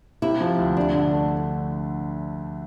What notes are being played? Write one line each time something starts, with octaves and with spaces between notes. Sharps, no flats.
C3 E4
F3
D2
D2 D4
D3
A3